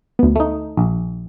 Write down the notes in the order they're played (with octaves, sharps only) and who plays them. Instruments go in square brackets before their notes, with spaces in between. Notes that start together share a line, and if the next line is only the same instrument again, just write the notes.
[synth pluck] D2 B3
[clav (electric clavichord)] A3 D#4
A#1